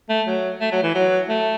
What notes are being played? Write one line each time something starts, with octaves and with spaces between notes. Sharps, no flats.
A3
F#3
A3
F#3
E3
F#3
A3